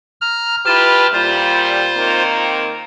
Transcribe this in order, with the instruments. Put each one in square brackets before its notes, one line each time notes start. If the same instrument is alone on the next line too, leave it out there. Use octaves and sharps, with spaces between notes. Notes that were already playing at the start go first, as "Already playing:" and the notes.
[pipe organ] A#5 F6
[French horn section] E4 G4 B4 [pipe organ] F4 A5 F6
[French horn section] A#2 G3 [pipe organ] F4 C5
[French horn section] D#3 A#3 C4